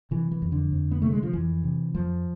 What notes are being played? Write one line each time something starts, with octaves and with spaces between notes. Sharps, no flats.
C3 E3
E3
F2
D3
F2
B3
C3 A3
G#3
F3
F2 E3
C3
F2 F3